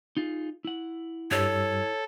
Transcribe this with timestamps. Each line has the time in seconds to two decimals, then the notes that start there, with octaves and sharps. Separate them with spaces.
0.17 D#4 F4 G#4
0.65 E4 F#5
1.31 G2 G3 A4 C#5 E6